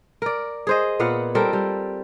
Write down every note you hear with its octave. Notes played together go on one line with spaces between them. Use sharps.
A#4 D5
G#4 C5 D#5
A#2 B3 F5 F#5
G3 C4 A4 A#4
G3